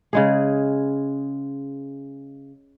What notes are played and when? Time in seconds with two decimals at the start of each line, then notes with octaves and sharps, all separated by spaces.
0.13 C#3 G#3 G#4